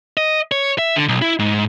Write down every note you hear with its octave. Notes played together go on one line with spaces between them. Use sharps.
D#5
C#5
E5
D3
B1
E4
G#2